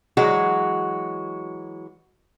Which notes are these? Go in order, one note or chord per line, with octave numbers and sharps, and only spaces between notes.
E3 F#3 G#3 F#4